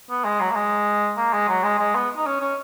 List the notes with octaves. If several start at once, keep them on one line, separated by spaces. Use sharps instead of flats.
B3
G#3
F#3
A#3
G#3
A#3
G#3
F#3
G#3
G#3
B3
D#4
C#4
C#4